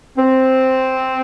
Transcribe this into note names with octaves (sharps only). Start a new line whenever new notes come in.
C4